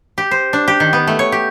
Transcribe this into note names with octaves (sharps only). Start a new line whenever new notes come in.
G4
C5
D4
G4
D#3
B3
A3
C#5
G4